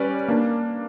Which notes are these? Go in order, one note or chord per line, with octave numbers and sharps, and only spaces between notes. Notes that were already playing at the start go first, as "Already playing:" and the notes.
Already playing: G3 C#4 B4 D5
A#3 D4